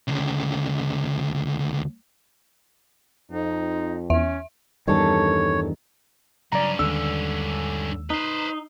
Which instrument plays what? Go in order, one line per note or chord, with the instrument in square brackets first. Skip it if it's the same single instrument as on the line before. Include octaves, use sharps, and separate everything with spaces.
[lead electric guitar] D2 C#3
[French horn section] F2 [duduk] D#4
[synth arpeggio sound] E2 [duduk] C#4 [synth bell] E5
[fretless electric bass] E2 G2 D#3 [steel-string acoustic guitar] G3 C#4 A4 [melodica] C#5
[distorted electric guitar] G2 C#4 [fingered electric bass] C#3 F#3 [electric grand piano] D5 A#5
[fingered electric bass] D#2 D#3 G#3 [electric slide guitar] D3 [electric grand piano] E6
[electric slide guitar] D#4 [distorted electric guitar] B4 C5